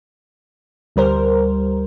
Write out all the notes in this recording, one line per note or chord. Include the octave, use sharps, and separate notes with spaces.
D2 G3 A#4 C5